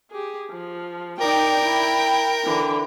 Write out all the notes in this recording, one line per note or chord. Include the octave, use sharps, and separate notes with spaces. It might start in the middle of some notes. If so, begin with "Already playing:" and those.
G4 G#4
F3
D#4 A#4 D5 G5
E4
D3 E3